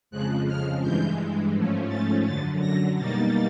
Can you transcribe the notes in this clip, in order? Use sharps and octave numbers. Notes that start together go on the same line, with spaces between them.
F2 C#3 F3 G#3 F#6
F6
G2 E3 G#3 G6
G#2 F3 A3 C#4
A6
F#2 D3 F#3 A6
A#6
B2 G3 A#3 D#4 A6